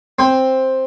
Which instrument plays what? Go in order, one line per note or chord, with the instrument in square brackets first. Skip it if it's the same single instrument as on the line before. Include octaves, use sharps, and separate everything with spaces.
[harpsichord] C4